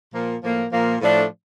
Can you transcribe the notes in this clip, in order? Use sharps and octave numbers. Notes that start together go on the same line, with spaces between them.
A#2 F3 A#3
A2 F3 A#3
A#2 F3 A#3
A2 F3 A3 D4